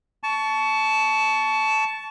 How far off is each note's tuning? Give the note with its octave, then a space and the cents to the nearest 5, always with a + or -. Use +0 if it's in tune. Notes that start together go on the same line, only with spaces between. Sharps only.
A5 -10 C#6 +20